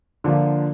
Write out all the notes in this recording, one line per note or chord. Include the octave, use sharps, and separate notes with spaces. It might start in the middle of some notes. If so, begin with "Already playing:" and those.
D3 F3 A#3 D4 F4